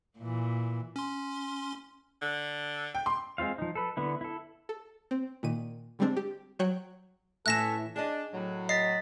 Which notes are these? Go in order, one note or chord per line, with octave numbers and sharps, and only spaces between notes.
A#2 E3
C#4 C6
D3
G5
C6
G#3 C4 F4 F5
F3 D#4
A4 B4
D3 B3 E4
E4 A4
A4
C4
A#2 D#3 D#7
D3 G3 G#3 C4 D4
G4
F#3 C#5 G5 F#6
A2 E3 C#4 A4 E5 F#6 A#6 E7
D4 G#4 D#5
A2 F#3
D#5 A6 B6 C7